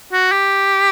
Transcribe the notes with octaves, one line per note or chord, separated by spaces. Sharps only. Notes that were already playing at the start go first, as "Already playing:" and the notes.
F#4
G4